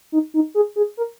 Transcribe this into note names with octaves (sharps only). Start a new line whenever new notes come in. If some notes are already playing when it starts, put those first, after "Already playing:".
D#4
D#4
G#4
G#4
A#4